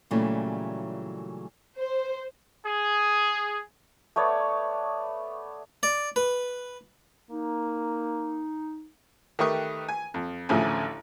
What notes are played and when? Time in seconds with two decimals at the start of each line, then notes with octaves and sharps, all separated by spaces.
0.11 A#2 C#3 E3 F#3 G3 A3
1.78 C5
2.65 G#4
4.16 A3 B3 C#5 D5
5.83 D5
6.16 B4
7.30 A#3 D#4
9.39 D#3 A3 G4 B4 C#6 D#6
9.89 G#5
10.14 F2
10.49 A1 D2 A2 C#3 F3 G#5